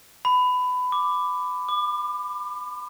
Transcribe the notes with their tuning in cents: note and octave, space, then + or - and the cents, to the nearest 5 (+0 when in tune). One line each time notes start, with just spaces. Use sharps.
B5 +20
D6 +5
D6 +35